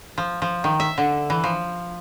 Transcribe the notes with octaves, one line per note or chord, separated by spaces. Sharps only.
F3
F3
D#3
E5
D3
E3
F3